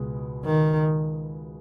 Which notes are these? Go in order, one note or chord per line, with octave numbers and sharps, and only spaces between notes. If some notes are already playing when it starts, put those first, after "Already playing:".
Already playing: C#2 B2 G#3
D#3